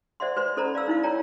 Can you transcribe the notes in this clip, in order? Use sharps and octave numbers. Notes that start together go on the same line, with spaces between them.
C5 D5 E5 F#5 C6
B4 C5 C6
C#4 A4 C5 D5 A#5 B5
D5 F5 E6
D#4 E4 F5
F4 C#5 D5 G5 A5 A#5